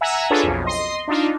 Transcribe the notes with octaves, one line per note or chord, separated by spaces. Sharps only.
E5 F#5 G#5 A#5 E6
D4 F4 G#4 A4 B4 C#5
B1 F2
D#5 C6
D4 D#4 F4